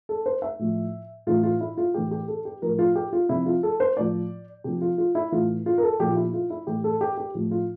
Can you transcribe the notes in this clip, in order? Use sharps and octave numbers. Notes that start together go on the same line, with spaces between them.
A4
C5
E5
A2 F3
A2 E3 F4
F4
E4
F4
A2 E3 G4
G4
A4
G4
A2 F3 A#4
F4
G4
F4
C3 F3 E4
F4
A4
C5
A2 F3 D5
C3 F3 G4
F4
F4
E4
A2 E3 F4
F4
A#4
A4
A#2 F3 G4
F4
E4
F4
E4
A2 E3 G4
A4
G4
G4
A2 F3
F4